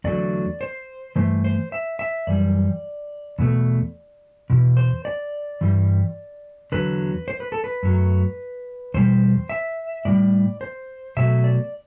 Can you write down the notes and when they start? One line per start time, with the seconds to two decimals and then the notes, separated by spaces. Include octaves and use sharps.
0.04 E2 D3 F#3 A3 D5
0.61 C5
1.16 G2 E3 A3 C5
1.44 C5
1.72 E5
1.99 E5
2.27 F#2 E3 G3 D5
3.39 E2 B2 A3
4.50 E2 B2
4.77 C5
5.05 D5
5.61 G2 E3 G3
6.72 E2 D3 F#3 B4
7.28 C5
7.40 B4
7.52 A4
7.64 B4
7.83 F#2 F#3 A3
8.94 E2 B2 G3 C5
9.49 E5
10.05 A2 E3 G3 D5
10.61 C5
11.17 B2 F#3 A3 E5
11.44 D5